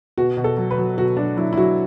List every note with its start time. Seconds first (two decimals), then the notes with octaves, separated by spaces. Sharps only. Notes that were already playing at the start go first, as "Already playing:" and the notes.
0.18 B2 F#4
0.37 B2
0.44 A4
0.57 F#3
0.71 B4
0.78 F#3
0.97 B2 F#4
1.17 F#3 D4
1.37 F#3 E4
1.53 E4
1.57 F#3 F#4